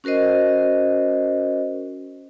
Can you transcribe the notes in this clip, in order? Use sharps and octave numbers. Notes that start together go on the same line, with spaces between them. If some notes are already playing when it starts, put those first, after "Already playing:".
C#4 F#4 A#4 C5 D#5